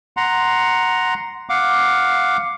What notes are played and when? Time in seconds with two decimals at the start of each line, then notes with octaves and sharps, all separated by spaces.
0.17 F#5 A#5 C6
1.49 F5 F#5 D6